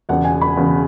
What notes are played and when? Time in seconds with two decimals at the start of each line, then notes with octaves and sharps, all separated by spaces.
0.09 E1 E2 C#3 F#5
0.25 G#5
0.42 B5
0.57 E1 E2 C#3